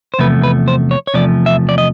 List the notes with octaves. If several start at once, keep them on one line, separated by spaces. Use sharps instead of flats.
C5
E2 C3 F3 A3 B4
B4
C5
C#5
C#5
E2 C3 F3 A3 D5
E5
D5
D#5